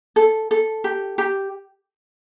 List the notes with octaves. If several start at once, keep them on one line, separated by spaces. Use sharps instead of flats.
A4
A4
G4
G4